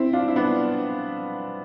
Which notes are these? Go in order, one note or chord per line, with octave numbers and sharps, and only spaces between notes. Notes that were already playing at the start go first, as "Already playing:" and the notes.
Already playing: C4 E4
D4 F4
E4
B3 D4